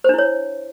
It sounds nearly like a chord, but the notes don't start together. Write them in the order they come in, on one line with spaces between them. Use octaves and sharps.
C5 D4 E4 C#5